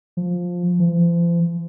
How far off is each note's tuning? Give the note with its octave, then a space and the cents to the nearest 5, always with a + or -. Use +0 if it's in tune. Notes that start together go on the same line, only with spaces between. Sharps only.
F3 +10
F3 -40